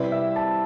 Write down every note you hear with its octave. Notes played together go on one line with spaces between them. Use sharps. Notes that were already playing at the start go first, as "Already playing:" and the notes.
Already playing: C3 G3 C4 E4 B4 D5
E5
A5